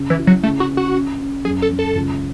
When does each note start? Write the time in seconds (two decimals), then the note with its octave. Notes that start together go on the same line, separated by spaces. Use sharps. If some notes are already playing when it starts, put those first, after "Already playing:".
Already playing: C#3
0.10 E3
0.19 E4
0.27 F#3
0.43 C#3 A3
0.60 F#4
0.69 C#4
0.77 F#4
0.94 C#4
1.20 C#4
1.45 F#2 G#4
1.62 A4
1.70 F#2
1.79 A4
1.95 C#2